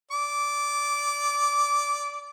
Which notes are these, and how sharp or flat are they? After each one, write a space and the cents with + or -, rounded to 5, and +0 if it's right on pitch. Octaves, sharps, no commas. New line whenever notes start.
D5 -20 D6 -10